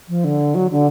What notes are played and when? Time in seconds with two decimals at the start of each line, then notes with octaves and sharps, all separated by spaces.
0.08 F3
0.24 D3
0.54 F#3
0.70 D3